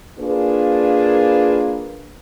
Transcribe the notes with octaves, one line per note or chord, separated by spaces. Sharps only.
A#3 D4 F4 G#4 B4